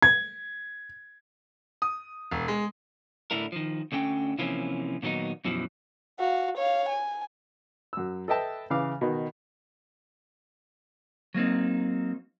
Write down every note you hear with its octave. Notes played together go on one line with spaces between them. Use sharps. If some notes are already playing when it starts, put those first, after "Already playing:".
G#6
D#6
E1
G#3
A2 D3 D4 E4 A#4
D#3 F3
D2 D3 C#4 G5
C3 E3 F3 A#3 C4 C#4
A#2 D#3 F#3 B3 D#4
F#2 B2 E3 F3
F#4 F5
C#5 F5
G#5
F#2 E6
A4 B4 D#5 E5 G5 A5
C#3 E3 F5 D6
B2 D#3
F#3 A#3 C4 D#4